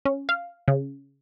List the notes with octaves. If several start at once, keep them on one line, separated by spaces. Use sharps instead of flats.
C#4
F5
C#3